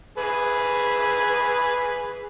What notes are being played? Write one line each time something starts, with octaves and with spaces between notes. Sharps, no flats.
G#4 B4